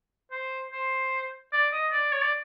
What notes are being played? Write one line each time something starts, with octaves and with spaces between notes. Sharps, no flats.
C5
C5
D5
D#5
D5
C#5
D5